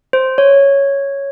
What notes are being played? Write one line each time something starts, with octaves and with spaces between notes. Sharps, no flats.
C5
C#5